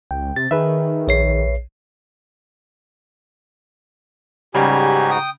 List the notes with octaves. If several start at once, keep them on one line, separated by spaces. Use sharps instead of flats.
C#2 G5
C3 A6
D#3 G#4 B4 E5
A#1 C#5 C7
G#2 C#3 G3 D#4 F#4 G4 G#5
G5 D#6